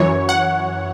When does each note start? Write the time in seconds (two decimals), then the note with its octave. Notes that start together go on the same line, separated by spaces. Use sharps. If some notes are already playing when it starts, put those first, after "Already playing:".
Already playing: F#2 E3 C#5
0.29 F#5